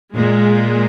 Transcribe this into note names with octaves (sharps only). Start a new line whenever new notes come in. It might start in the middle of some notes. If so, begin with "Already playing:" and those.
A#2 G#3